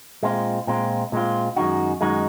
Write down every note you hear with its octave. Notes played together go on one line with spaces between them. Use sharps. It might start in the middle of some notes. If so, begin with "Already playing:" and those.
A#2 G#3 C4 F4
A#2 G#3 C4 F4
A#2 G#3 C4 F4
F#2 D#3 G#3 D#4 F#4
F#2 D#3 G#3 D#4 F#4